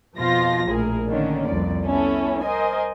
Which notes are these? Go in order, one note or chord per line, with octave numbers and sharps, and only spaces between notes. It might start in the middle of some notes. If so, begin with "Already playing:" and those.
F2 B2 F3 F4 A#6
A#1 A2 G#4 A#4
D3 D#3 A#3 C#4 D4
C2 F2 D5
B3 C#4 E4 A4
A#4 C5 D#5 G#5